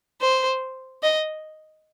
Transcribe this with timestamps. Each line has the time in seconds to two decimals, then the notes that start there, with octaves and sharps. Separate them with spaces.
0.21 C5
1.03 D#5